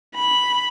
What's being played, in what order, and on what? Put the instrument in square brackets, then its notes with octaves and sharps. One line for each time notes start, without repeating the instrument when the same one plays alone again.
[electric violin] B5